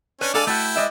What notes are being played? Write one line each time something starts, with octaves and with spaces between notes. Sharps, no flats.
C#4 D4 B4
G#3 D4 A4 D5 F5 G#5
A3 E4 F#4 G5
G#3 D5 E5